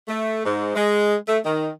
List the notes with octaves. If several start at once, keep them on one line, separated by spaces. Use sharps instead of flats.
A3
G#2
G#3
A3
D#3